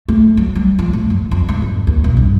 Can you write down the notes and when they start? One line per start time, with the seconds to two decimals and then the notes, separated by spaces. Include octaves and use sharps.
0.08 A3
0.37 F#3
0.55 G3
0.79 F3
0.93 A2
1.10 F#2
1.31 F2
1.49 G#2
1.62 F2
1.87 D#2
2.04 B1
2.17 G2